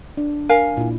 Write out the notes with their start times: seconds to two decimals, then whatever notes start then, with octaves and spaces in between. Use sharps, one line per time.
0.17 D4
0.49 A#4 F5 G#5
0.77 A#2 E4